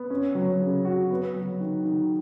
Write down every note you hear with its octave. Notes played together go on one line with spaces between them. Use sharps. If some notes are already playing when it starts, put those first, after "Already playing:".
Already playing: B3
C#4
F#3
C#3
F#4
B3
F#3
D#3
D#3